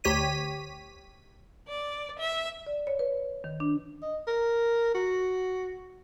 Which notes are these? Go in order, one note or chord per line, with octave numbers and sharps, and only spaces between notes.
D2 G4 C#5 B6 D#7
D5
E5
D5
C#5
B4
D#3
D4
D#5
A#4
F#4